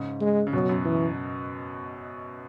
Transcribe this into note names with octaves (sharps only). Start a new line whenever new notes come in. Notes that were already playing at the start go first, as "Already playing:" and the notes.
Already playing: G#2 C#3
G#3
C#3
F#2 B2 F#3
F#2
E3